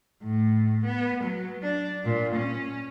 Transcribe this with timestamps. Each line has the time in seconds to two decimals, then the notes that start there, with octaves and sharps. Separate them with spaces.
0.23 A2
0.85 B3
1.24 F#3
1.63 D4
2.05 A#2
2.35 C#4